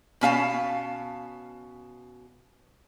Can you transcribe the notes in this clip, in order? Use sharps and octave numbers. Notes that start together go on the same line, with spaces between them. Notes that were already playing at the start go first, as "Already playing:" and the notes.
B2 C#4 F5 A5